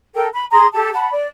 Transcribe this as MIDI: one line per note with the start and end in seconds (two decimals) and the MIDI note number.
0.14 0.27 69
0.14 0.27 70
0.14 0.27 79
0.33 0.45 83
0.52 0.66 68
0.52 0.66 82
0.52 0.66 84
0.52 0.66 87
0.73 0.90 67
0.73 0.90 69
0.73 0.90 81
0.93 1.11 78
0.93 1.11 81
0.93 1.11 83
1.11 1.26 74